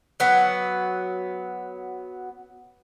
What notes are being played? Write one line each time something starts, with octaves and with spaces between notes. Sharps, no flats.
F#3 B3